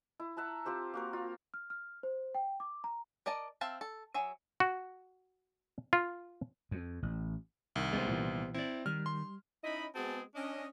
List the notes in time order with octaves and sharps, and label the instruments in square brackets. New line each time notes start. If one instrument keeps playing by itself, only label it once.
[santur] E4
E5 F#5 A5 A#5
C4 F4 G4 C5
A#3 F#4 A#4
F4
[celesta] F6
F6
C5
G5
D6
A#5
[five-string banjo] A#4 D5 D#5 A5
C4 E5 F5 A5
A4
F#3 G#4 E5
[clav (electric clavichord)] F#4
F4
[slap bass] F2
A1
[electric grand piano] C2 D#3
[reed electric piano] C#2 C#3 G#3 [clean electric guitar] B3 G4 C5
[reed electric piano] A#2 E3
[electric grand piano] C4 [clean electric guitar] E4 D5
[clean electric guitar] D#3 [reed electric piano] G3 [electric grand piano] F6
[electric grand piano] C6
[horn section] C#4 D#4 E4 D#5 B5
G#3 B3 C4 F#4 G#4 A5
C#4 D4 D#5